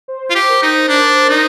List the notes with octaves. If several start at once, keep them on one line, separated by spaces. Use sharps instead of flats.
C5
F4
G4
A#4
D#4
D4 C5
C5
D#4 A#4